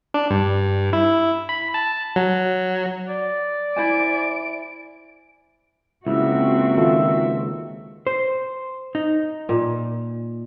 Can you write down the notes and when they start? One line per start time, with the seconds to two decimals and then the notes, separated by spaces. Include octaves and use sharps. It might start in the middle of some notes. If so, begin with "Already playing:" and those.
0.14 D4
0.31 G2
0.93 E4
1.49 B5
1.74 A5
2.16 F#3
3.08 D5
3.76 E4 C5 G#5 D7
6.07 C#2 A#3 C4 E4 F#4 E5
6.77 D#3 F4 A4 E5
8.07 C5
8.95 D#4
9.49 A#2